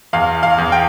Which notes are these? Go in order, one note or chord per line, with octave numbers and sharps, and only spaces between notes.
E2 F5
F5
E2
G5